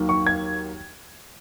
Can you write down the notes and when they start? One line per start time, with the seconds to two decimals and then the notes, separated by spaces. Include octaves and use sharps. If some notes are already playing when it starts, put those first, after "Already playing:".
Already playing: D#2 D#3 F#3 A#3
0.09 C#6
0.26 G#6